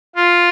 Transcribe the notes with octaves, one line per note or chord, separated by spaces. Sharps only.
F4